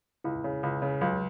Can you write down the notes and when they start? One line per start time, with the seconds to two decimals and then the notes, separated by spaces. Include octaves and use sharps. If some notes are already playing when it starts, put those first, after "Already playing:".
0.24 C#2 E4
0.44 C#3
0.63 C#2
0.82 C#3
1.01 C#2 F#3